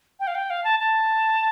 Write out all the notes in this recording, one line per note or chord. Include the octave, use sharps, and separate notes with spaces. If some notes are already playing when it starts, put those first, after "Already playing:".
G5
F5
G5
F5
A5
A5